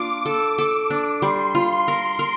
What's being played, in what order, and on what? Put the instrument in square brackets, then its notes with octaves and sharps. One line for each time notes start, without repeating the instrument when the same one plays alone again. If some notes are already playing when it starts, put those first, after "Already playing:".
Already playing: [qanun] A#3 D4 F4 [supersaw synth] D6
[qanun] A4
[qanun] A4 [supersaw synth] D6
[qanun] D4
[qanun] G3 [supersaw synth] C6
[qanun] F4 [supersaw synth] C6
[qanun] A#4
A#4